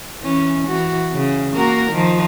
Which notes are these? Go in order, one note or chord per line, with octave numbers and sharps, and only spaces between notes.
E3 C#4
E3 F#4
C#3
A#3 F#4 A#4
D#3 F3